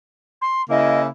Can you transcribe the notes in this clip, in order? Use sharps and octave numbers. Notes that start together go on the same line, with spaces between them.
C6
C#3 A#3 E4 D#5